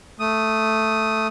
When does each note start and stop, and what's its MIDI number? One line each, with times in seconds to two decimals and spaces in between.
0.20 1.27 57
0.20 1.27 87